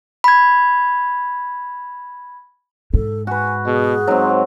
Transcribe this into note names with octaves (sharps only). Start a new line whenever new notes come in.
B5 G#6
G#2 A4
F#4 B4 G#5
B2 G#4
G#2 F#3 C4